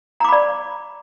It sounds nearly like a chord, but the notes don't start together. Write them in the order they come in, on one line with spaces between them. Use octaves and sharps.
A#5 D6 B5 D5